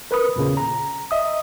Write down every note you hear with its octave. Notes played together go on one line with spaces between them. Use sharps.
A#4 B4 B5 D#6
E2 A#2 C#3
A#5
D#5 E5 D#6